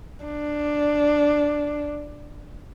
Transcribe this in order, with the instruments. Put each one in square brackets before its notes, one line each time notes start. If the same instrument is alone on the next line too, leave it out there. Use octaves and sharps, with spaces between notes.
[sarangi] D4